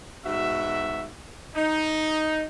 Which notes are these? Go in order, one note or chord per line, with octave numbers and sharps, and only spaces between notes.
G#2 B2 F#4 E5
D#4